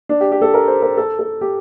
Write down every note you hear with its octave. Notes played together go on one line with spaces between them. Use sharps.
D4
G4
G4
A4
A#4
C5
A#4
A4
A4
G4